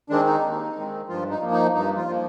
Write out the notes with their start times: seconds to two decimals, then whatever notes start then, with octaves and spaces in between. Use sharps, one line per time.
0.10 D#3 G#3 C4 D4
0.26 D#4
0.43 D#2
0.76 D#3 G#3 C4
1.08 G2 F3 F4
1.30 D#4
1.41 F3 A#3
1.52 D#4
1.74 G2 D#4
1.96 F3 F4
2.07 F3 A#3